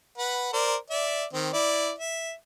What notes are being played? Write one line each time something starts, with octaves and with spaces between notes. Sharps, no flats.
B4 F#5
A#4 C5 D5
D5 E5
D#3 C4
E4 D5
E5